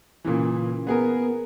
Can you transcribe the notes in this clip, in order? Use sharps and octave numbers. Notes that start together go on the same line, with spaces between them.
A#2 C#3 E3
B3 G#4 A#4